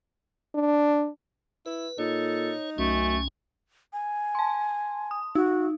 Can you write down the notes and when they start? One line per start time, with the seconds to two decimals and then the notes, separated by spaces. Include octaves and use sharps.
0.55 D4
1.66 E4 B4
1.99 A#2 D#4 A4 C#5
2.78 C2 F#2 A3 C#4 G#5
3.93 G#5
4.35 A5 C6
5.11 D#6
5.35 D#4 F#4